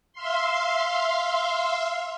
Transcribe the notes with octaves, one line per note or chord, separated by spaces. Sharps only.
E5 F5 C6